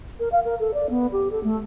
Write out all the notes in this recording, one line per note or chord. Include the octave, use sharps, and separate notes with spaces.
A#4
F5
A#4
A4
D5
B3
G4
A4
A3